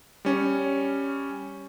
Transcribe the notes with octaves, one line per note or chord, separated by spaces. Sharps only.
G3 C#4